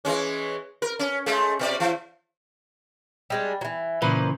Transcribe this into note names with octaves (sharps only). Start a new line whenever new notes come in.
E3 G#3 C#4
A#4
C#4
G#3 A3
B2 A#4 D5
E3
G3 G#3 D4
E3 F#3
A#2 C#3 E3 B4 C5